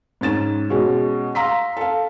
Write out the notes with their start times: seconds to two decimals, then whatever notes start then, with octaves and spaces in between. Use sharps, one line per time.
0.21 G#2 C#4 A6 E7
0.70 B2 G#3 C#4
1.35 F5 A#5 C6 E6 B6
1.77 A4 F5